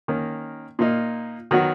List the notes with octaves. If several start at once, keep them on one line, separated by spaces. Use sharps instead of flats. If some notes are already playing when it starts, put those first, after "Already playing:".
D#3 A#3 C#4
A#2 A#3 D#4
D#3 F#3 B3 F#4